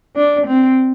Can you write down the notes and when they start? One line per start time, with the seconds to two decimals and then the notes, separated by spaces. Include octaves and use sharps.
0.16 D4
0.47 C4